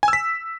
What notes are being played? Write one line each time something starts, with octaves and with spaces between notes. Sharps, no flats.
G#5
E6
B6